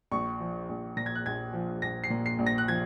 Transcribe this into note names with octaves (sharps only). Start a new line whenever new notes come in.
A#1 C#6
F3
A#1
A#2 A#6
G#6
F#6
A#1 G#6
F3
A#1 A#6
C7
A#2
C7
A#1
A#6
F#6
F3 G#6